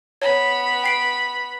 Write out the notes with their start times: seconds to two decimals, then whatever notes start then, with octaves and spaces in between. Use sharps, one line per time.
0.22 B3 C#5 B5
0.83 G5 C7 D7